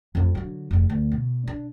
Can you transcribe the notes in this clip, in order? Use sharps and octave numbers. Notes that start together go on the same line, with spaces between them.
A1 F2
D3 F#3
F1 E2
D2
B2
D4